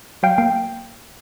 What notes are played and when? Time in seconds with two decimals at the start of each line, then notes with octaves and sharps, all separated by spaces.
0.23 F#3 F5 G5
0.38 A#3 F5 G5